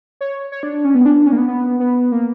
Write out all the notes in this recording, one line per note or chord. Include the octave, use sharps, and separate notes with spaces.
C#5
C#5
D4
D4
C#4
B3
D4
D4
C#4
A#3
B3
B3
B3
A#3